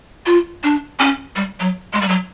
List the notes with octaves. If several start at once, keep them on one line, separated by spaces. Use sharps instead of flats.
F4
D4
C#4
G3
F#3
G#3
G3
F#3